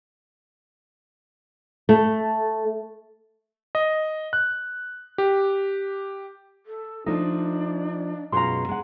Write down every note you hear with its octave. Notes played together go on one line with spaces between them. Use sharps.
A3
D#5
F#6
G4
A4
F3 A3 D4 D#4
F#2 B2 G#3 F4 A#5 C6
G#3 F#5